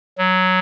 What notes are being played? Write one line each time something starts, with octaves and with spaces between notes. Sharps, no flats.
F#3